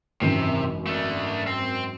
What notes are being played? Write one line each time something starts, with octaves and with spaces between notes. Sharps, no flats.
G#1 F#2 C3 E3
A3 D4
C4